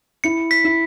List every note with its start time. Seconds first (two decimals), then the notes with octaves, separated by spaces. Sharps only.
0.24 E4 C#7
0.51 B6
0.64 E4